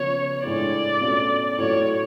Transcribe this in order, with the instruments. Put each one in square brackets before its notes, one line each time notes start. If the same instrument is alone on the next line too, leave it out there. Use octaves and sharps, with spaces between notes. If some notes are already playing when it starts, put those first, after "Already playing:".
Already playing: [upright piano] C#3 F3 B3 [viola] C#5
[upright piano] A2 G#3 D4 F4 [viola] D5
[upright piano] B2 A3 C#4 F4
[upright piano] A2 F#3 A3 F4 [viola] C#5